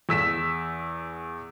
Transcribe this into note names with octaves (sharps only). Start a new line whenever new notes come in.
E2 E6 B6 E7